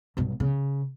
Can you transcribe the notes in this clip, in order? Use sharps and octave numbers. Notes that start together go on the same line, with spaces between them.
B1 G2
C#3